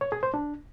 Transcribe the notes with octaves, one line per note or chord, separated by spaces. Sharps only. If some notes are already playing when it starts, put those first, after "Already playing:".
C#5
G#4
C5
D4